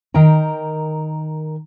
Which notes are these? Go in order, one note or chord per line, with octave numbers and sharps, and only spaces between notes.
D#3 A#4 G5 A#5